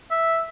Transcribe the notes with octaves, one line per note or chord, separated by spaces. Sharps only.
E5